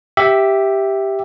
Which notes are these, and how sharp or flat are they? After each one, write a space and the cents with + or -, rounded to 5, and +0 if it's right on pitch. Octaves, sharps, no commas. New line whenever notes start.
G4 +0 E5 +0